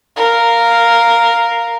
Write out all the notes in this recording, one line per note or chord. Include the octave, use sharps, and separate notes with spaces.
A#4 F5